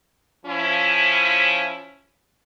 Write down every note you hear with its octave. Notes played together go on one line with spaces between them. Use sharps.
F3 C#4 E4